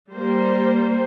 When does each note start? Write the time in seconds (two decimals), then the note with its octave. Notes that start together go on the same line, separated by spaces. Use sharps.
0.11 G3 A#3 C5